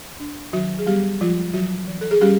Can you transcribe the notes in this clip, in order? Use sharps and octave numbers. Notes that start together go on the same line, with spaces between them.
D4
D#3 F#3 F#4
G#4
G3 B3 G4
F3 G#3 F4
E3 F#3 F#4
E3
A4
G#4
G3 C#4 G4